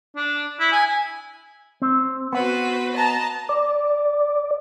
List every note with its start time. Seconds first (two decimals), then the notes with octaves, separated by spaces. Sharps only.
0.16 D4
0.60 E4
0.72 G#5
1.82 C4
2.33 B3 F#4 B4 C5 F#5
2.94 D#5 A5 A#5
3.49 D5